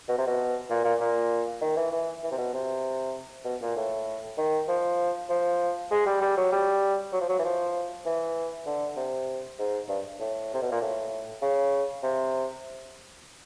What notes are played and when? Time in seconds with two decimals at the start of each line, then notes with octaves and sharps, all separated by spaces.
0.08 B2
0.18 C3
0.27 B2
0.70 A#2
0.84 A#2
1.00 A#2
1.61 D#3
1.76 E3
1.92 E3
2.23 E3
2.31 C3
2.38 B2
2.53 C3
3.45 B2
3.61 A#2
3.76 A2
4.38 D#3
4.68 F3
5.29 F3
5.91 G#3
6.06 G3
6.21 G3
6.37 F#3
6.52 G3
7.12 F#3
7.21 F3
7.29 F#3
7.39 E3
7.44 F3
8.06 E3
8.66 D3
8.96 C3
9.59 G#2
9.88 G2
10.20 A2
10.53 C3
10.62 B2
10.71 A#2
10.81 A2
11.42 C#3
12.03 C3